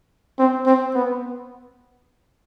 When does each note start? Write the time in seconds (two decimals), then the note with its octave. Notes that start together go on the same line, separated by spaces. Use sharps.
0.39 C4
0.66 C4
0.95 B3